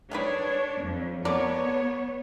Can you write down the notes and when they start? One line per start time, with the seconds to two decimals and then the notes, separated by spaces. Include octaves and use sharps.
0.11 D#3 D4 G#4 B4 C#5
0.84 F2
1.25 B3 A4 A#4 C#5 D5